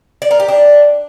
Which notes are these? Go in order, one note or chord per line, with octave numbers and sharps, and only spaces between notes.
D5
A#4
G4
D4